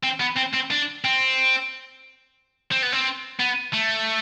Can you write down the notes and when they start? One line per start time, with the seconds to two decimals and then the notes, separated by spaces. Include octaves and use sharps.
0.03 C4
0.20 B3
0.36 C4
0.53 C4
0.71 D4
1.04 C4
2.72 C4
2.83 B3
2.93 C4
3.40 B3
3.73 A3